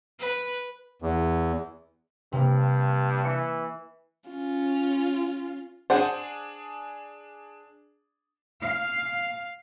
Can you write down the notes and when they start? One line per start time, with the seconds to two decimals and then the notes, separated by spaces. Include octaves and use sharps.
0.19 B4
1.02 E2
2.33 G2 C3 A#3
3.25 E3 C#7
4.30 C#4 F4
5.90 D4 G#4 C5 F#5 G#5
8.61 F5